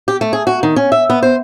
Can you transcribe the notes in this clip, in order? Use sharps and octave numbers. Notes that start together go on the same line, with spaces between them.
G4
A3
G#4
F#4
D#3
C#4
E5
B3
C5